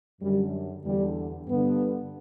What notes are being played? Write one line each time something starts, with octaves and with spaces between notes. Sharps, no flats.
F#2 D3 G3
E2 D3 G3
G2 D3 B3